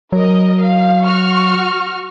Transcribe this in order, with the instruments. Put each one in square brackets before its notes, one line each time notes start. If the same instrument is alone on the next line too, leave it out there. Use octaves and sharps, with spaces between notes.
[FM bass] F#3 [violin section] A#4 D#5
[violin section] F5
F#4 C#6 F6